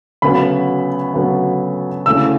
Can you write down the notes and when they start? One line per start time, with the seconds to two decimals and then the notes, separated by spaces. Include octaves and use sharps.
0.22 D2 C#3 F#3 B3 B5
1.14 D2 C#3 F#3 B3
2.06 D2 C#3 E3 A3 E6